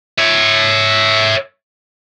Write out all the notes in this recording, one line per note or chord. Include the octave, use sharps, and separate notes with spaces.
C#5 E5